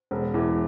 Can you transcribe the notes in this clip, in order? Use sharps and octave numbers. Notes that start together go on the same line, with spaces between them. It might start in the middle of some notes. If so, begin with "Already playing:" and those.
E1
E2 E3